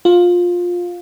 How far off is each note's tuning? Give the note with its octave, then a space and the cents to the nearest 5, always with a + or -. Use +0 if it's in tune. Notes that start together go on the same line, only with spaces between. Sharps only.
F4 +15